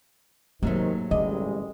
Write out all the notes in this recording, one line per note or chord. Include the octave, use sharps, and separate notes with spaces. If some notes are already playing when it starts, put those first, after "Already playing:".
G#2 C3 D#3 F#3 A3 A#3
A1 D3 G3 G#3 D#5